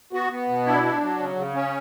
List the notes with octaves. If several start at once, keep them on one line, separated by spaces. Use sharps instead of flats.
B3 F#4
B3
B2
D4 E4
D4
F#3
C#3
C#3
C#4